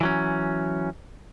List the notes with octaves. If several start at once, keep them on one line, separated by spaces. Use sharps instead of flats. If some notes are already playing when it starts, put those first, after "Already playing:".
E3 F#3 C#4